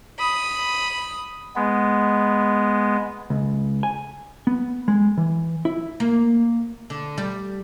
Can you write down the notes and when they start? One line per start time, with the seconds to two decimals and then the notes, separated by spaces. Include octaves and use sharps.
0.19 B5 D#6
1.56 G#3 B3
3.30 C#2
3.83 G#5
4.47 B3
4.88 G#3
5.17 E3
5.65 E4
6.00 A#3
6.90 D3
7.18 G3